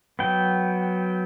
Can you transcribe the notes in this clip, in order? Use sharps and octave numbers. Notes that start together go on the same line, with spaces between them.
F#3 B3 G5